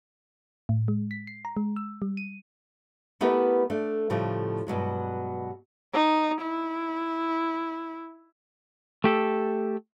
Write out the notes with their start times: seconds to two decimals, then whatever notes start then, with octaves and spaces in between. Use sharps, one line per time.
0.69 A2
0.88 G#3
1.11 B6
1.27 C7
1.45 A#5
1.57 G#3
1.76 E6
2.02 G3
2.17 D#7
3.21 A3 B3 E4 G4 A#4 B4
3.70 A3 D4
4.10 A2 C#3 F3 G3 A3
4.67 G2 B2 F#3 G#3
5.94 D#4
6.42 E4
9.04 A3 G4 A4